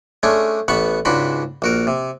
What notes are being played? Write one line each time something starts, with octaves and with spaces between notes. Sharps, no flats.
G#3 A3 C#4 D4
A1 B3 F#5 A5 B5 C#6
C#2 G#2 D4 F#4 B5 C6
A#1 F#4 A#4
C3